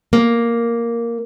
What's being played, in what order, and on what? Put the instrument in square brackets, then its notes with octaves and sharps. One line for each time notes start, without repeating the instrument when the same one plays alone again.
[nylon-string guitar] A#3